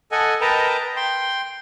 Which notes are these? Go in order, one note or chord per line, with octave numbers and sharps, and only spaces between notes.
A4 D#5 F#5 G#5
A#4 B4 D#5 G5 A5 A#5
G5 C6